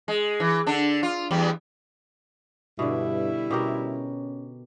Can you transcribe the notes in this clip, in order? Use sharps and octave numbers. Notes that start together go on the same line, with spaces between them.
G#3
E3
D3 D4
F4
E2 G3
G2 B2 D3 G3 E4
B2 C#4 G4 A#4